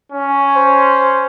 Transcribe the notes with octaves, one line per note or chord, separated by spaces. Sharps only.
C#4
C5